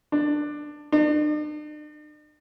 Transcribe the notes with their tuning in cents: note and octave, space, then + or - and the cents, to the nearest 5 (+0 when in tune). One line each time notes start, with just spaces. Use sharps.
D4 +15
D4 +45